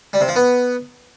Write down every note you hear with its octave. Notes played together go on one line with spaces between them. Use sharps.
G3
C3
F3
B3